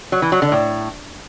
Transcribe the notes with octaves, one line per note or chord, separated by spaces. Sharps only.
F#3
E3
F#3
D3
A2